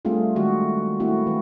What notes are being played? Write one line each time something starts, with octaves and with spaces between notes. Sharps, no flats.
G3 A3 C4 D4 F4 G#4
D#3 G#3 F#4
A3 A#3 C4 E4 F#4
E3